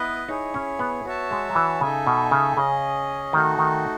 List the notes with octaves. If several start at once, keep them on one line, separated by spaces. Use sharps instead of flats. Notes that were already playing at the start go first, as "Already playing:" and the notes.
Already playing: B3 E4 B4 D#5
D#4 E4 G#4 C#5
C#4
B3
B3 F#4 C#5 E5 A5
G#3
F#3
E3
C#3 D#4 A4 E5 G#5
B2
C#3
C#3 C#4 G#4 D#5
D#3 A3 D#4 F#4
D#3